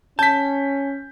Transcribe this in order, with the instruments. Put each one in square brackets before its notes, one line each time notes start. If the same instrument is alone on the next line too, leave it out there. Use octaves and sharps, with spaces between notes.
[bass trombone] C#4 [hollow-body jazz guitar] A5 [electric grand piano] G6 B6